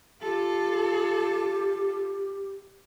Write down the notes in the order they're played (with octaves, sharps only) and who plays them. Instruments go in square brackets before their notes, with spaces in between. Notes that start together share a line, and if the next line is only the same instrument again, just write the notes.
[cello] F4 A4 [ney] G4